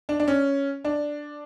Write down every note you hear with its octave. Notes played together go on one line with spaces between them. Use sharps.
D4
D4
C#4
D4